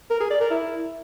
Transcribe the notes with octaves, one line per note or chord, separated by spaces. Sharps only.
A#4
G#4
D5
A#4
E4